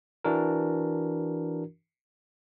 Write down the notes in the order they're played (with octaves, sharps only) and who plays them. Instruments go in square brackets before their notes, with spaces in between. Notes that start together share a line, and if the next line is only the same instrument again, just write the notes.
[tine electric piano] E3 D4 F#4 A#4